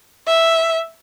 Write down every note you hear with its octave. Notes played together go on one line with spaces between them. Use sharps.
E5